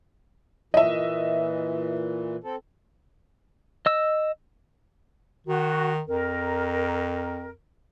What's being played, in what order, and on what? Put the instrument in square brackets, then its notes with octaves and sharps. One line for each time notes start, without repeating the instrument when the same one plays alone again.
[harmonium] A#2 E3 [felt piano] D#5 E5
[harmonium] C4 A4
[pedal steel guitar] D#5 E6
[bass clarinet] D#3 [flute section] F#4
[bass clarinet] F2 [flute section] A#4